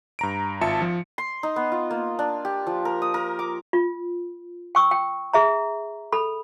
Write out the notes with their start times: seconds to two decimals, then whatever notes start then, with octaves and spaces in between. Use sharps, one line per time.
0.19 G2 A#5 D7
0.61 G#1 F4 E5 A5 C#7
0.82 F3
1.18 C6
1.43 D#4
1.56 B3
1.72 F4
1.91 A#3
2.19 D4
2.45 G4
2.67 F3
2.85 A#4
3.02 D#6
3.14 A#4
3.39 D6
3.73 F4
4.75 G5 C#6 E6
4.91 G5
5.33 G#4 E5 A#5
6.12 A4 B5